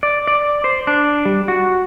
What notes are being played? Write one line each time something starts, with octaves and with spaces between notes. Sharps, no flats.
D5
D5
C5
D4
G3
F#4